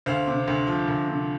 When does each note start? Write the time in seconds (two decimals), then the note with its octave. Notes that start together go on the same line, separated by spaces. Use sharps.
0.06 D2 C5 F5
0.27 C3
0.48 D2
0.67 F3
0.88 D2
1.08 C3